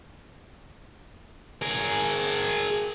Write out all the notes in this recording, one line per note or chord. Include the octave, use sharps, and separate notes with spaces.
G#4 A#4